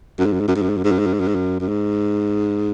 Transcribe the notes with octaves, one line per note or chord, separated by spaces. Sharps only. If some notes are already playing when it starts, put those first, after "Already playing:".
F#2
G#2
F#2
G#2
F#2
G#2
F#2
G#2
F#2
G#2
F#2
G#2
F#2
G#2
F#2
G#2
F#2
F#2
G#2